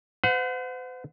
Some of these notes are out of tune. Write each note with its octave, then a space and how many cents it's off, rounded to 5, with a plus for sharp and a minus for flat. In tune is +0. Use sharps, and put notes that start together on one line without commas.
C5 -45 F#5 -30